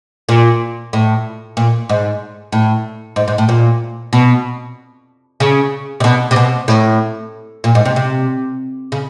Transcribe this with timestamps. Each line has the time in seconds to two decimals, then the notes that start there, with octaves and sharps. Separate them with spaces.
0.29 A#2
0.93 A2
1.57 A#2
1.89 G#2
2.52 A2
3.16 G#2
3.28 G#2
3.38 A2
3.49 A#2
4.13 B2
5.40 C#3
6.00 C3
6.04 B2
6.31 C3
6.36 B2
6.68 A2
7.64 A#2
7.75 G#2
7.85 C3
7.96 C3
8.92 C#3